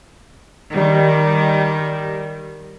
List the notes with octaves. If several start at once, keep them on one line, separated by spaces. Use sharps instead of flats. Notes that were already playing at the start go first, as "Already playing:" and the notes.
D#3 G3